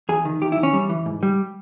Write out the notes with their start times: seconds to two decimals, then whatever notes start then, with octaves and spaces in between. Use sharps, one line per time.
0.09 E2 G#4
0.25 D#3
0.41 E2 G4
0.52 E4
0.57 E2
0.63 C#4
0.73 G3
0.89 E3
1.06 G#2
1.23 G3